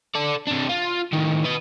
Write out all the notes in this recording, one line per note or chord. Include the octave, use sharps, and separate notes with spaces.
A4 D5
C3 D4
F4
A2 D#3
B4 D#5